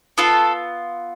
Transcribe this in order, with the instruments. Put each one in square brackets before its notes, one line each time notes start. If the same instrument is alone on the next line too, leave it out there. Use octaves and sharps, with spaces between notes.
[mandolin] B3 F4 A4